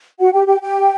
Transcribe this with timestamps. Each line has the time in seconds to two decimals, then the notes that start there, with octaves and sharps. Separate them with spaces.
0.19 F#4 F#5
0.33 G4 G5
0.47 G4 G5
0.61 G4 G5